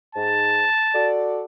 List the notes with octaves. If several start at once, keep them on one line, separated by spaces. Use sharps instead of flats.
G#2 A5
F#4 A4 D5